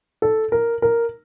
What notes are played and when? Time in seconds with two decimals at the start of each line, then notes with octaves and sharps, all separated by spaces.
0.22 A4
0.52 A#4
0.82 A#4